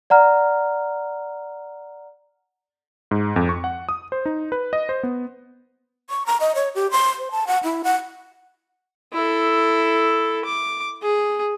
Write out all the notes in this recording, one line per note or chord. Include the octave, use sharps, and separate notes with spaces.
D5 F#5 A#5 F6
G#2
F2
C#6
F#5
D#6
C5
D#4
B4
D#5
C5
B3
C#6
A#5
D#5
C#5
G4
C6
C5
A5
F#5
E4
F#5
E4 A4
D6
G#4